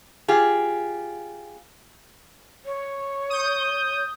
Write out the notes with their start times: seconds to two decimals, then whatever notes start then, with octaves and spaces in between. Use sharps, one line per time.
0.28 F4 G4 G#4
2.65 C#5
3.30 D#6 G6